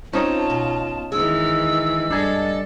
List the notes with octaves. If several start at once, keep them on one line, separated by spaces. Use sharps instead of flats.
C4 C#4 D#4 F4 C#5 A5
B2
D#3 E3 G#3 E6
G2 D4 G#4 A4 D#5